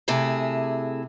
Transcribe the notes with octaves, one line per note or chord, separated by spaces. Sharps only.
C3 A3 E4 G#4